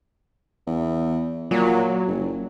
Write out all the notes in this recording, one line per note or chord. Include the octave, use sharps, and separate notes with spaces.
E2
A#2 F#3
F#1